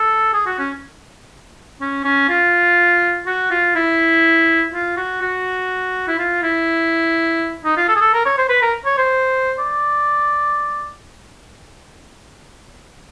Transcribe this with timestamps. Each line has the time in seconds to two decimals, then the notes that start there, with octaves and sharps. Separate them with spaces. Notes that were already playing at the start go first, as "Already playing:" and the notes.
Already playing: A4
0.33 G#4
0.46 F#4
0.59 C#4
1.81 C#4
2.05 C#4
2.29 F4
3.26 F#4
3.51 F4
3.75 E4
4.72 F4
4.97 F#4
5.21 F#4
6.08 E4
6.19 F4
6.42 E4
7.64 D#4
7.77 F4
7.88 A4
7.96 G#4
8.01 A4
8.14 A#4
8.25 C#5
8.38 C5
8.49 B4
8.62 A#4
8.86 C#5
8.98 C5
9.59 D5